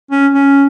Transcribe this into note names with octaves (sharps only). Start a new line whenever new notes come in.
C#4
C#4